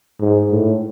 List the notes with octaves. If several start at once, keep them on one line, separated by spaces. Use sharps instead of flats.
G#2
A2